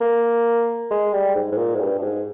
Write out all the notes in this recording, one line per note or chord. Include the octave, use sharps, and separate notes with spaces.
A#3
G#3
G3
G#2
G#2
A#2
G#2
G2
G2
G#2